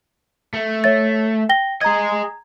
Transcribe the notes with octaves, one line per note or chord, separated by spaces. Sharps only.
A3
C#5 E5 A6
G5 A#6 G7
G#4 D#5 A#5 G#6